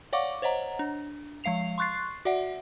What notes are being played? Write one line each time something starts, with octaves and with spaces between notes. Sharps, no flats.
C#5 D5 F5 F#5 C#6 D6
C5 C#5 D#5 F#5 A#5
D4
F3 G#3 F5 C7 F7
C6 C#6 F#6 A6 C7
F#4 D5 E5 F#5